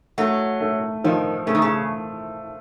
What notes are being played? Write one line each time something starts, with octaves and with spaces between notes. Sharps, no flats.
F#3 A3
A3
D#3 F3
C#3 A3
D#3
C#3